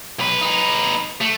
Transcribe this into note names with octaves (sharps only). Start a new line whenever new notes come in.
B1 B4
D#4 B4
A3